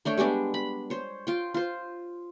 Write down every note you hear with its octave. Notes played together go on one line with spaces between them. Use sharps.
A3 D4 C#5 G5
G3 G#3 B3 D4
B5
C5 C#5
F4 G5
F4 C5